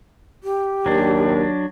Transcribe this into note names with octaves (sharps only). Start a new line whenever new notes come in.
G4
D#2 F#3 D4